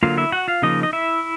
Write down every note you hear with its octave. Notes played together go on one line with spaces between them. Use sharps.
D3 F#3 A#3 F4 F5
E4 E5
F#4 F#5
F4 F5
C#3 F3 A#3 D#4 D#5
D#5
E4 E5